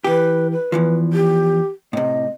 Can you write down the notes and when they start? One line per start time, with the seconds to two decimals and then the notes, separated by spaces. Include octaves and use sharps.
0.04 E3 G4 B4
0.51 B4
0.72 E2 E3 F3
1.13 G4
1.93 A2 C3 D#5